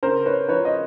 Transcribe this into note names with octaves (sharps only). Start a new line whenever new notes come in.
C#3 A#4 C5
B4 C#5
F3 B4 C#5
D#5